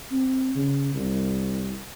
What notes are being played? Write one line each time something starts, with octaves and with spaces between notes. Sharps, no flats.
C4
C#3
C2